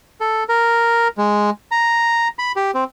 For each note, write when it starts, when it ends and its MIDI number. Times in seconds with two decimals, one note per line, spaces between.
0.21 0.44 69
0.49 1.08 70
1.18 1.50 56
1.71 2.28 82
2.39 2.52 83
2.56 2.71 67
2.74 2.84 60